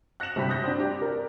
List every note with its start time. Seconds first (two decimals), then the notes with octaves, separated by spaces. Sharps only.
0.20 F#6 A#6 C#7 E7 F#7
0.36 G1 G2 C3 G4 B5 B6
0.49 D#6 F#6 G6 A#6
0.64 C4 D4
0.80 G4 D5 D6
1.02 A#4 D5